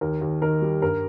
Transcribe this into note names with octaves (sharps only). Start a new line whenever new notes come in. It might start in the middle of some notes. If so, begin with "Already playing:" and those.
D#2 A#4
D#2
D#3 A#4
G3
G2 A#4